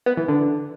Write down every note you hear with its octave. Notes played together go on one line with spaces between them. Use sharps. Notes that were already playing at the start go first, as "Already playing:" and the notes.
B3
E3
D3